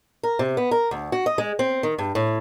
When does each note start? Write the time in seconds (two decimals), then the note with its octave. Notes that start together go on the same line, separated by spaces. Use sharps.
0.23 A#4
0.39 C3
0.57 B3
0.71 A#4
0.91 D2
1.12 F#4
1.26 D#5
1.38 G#3
1.59 C4
1.83 D#3
1.98 G2
2.15 A2